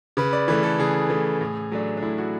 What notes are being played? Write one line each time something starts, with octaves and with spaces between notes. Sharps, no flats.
C#3 B4
D5
E3 A3 B4
A4
C#3 G#4
E3 A3
A2
F#3 A3 D4
D4
A2 E4
F#4